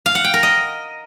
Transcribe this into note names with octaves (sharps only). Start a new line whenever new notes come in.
F5
F#5
G5
A#4
D#5